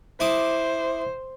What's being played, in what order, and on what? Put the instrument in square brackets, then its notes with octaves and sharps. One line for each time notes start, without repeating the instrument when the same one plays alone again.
[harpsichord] E4 D6 D#6 [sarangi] C5